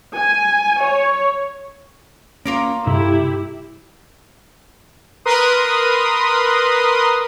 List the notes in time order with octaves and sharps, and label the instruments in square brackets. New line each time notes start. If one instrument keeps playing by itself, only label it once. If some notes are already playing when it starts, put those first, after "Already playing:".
[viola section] G#5
C#5
[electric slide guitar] A#3 C#4 [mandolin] F4 A#5 D6
[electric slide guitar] G2 C3 A4 [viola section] E4 G4
[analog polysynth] A#4 B4 C6 D#6